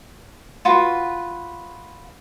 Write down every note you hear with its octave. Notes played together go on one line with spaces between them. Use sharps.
F4 F#4 B4